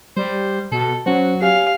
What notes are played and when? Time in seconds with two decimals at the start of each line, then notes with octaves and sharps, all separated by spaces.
0.17 G3 C5
0.72 B2 A4
1.06 F#3 C#4 F#4 C5
1.42 C#4 G4 F5